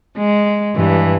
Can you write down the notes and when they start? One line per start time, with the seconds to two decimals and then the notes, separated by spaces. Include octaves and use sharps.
0.17 G#3
0.75 G2 E3